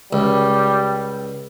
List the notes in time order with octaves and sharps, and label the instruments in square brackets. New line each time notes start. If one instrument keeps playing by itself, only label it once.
[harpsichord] C#2 [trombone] G3